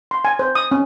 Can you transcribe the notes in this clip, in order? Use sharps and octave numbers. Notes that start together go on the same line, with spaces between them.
C6
G#5
C5
D#6
C#4